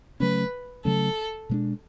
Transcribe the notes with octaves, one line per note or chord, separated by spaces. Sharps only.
C#3 F#3 A3 C#4 B4
C#3 F#3 A3 C#4 A4
B2 G#3 B3 D4